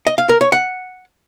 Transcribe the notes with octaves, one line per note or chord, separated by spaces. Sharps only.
D#5
F5
A#4
C#5
F#5